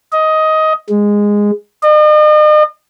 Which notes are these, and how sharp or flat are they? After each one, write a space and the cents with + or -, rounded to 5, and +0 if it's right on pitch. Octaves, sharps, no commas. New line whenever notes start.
D#5 +15
G#3 -10
D#5 -40